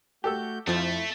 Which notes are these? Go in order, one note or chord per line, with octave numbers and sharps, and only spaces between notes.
A3 F#4 G4 A4 E6 G6
F2 F3 A3 E4